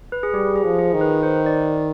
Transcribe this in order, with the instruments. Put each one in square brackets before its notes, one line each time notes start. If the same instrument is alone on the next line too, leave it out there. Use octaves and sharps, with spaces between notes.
[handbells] B4
G#4
[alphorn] G3 [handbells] G4
[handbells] G#4
[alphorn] F3
[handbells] G#4
[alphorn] D#3
[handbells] B4
C5
D5